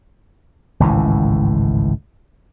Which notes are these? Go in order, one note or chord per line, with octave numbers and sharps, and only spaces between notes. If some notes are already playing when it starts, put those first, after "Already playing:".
G#1 C#2 A2 E3